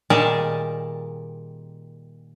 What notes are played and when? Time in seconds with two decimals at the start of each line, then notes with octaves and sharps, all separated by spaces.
0.10 A#2 D#3 G3 G#4 A#4 A5